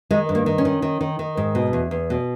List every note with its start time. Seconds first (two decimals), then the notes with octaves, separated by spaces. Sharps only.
0.11 D#3 G#3
0.29 G2
0.35 A#3
0.46 D#3
0.58 C#4
0.65 D#3
0.82 D#3
1.01 D#3
1.19 D#3
1.37 G#2
1.55 B2
1.73 E2
1.91 E2
2.10 B2